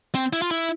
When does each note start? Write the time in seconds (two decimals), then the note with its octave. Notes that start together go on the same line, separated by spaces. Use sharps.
0.15 C4
0.33 E4
0.42 F4
0.51 E4